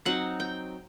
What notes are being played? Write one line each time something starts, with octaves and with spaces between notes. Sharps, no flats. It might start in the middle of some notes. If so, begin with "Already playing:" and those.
F#3 C4 D#4 F#5
G5